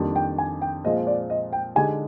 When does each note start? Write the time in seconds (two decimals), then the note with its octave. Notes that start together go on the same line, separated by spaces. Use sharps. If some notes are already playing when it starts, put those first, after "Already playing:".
Already playing: F2 D#3 G3 A#3 D4
0.16 G5
0.38 G#5
0.62 G5
0.84 A#2 F3 G#3 C4 F4 D#5
1.07 D5
1.30 D#5
1.53 G5
1.75 D3 G#3 D#4 G4 G#5